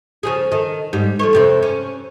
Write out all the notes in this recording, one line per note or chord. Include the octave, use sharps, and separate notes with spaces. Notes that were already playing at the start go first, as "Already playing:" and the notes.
C#3 F3 G#4
D#3 A4
G#2 G3
F3 A3 C#5
F2 C3 C4
C#4